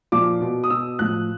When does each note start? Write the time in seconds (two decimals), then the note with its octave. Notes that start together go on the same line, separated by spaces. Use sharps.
0.12 A#2 F3 D6
0.41 B2
0.64 D#6
0.70 B2 E6
0.99 A2 F3 F#6